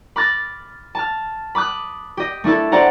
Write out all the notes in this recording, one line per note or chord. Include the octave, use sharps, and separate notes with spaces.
B5 D6 F6 F#6 A6 A#6
A5 F6
B5 D6 D#6 F#6
G4 D#5
A3 D4 E4 A4
D4 G4 C5 D5 F#5 A#5